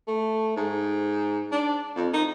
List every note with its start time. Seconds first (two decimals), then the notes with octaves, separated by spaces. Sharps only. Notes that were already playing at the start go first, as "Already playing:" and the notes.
0.08 A3
0.56 G#2
1.51 D4
1.96 F2
2.13 D#4